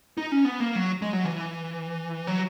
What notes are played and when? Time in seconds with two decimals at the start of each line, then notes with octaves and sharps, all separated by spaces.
0.18 D#4
0.32 C#4
0.45 B3
0.60 A#3
0.75 F#3
1.02 G#3
1.13 F#3
1.24 E3
2.27 F#3